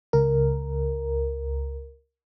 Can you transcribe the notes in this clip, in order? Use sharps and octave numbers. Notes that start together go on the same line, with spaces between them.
C#2 A#4